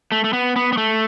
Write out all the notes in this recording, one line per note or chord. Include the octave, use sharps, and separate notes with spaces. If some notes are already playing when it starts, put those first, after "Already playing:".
A3
A3
B3
B3
B3
A3